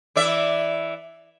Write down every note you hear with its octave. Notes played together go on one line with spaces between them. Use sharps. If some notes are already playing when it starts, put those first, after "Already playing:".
E3 D5 E5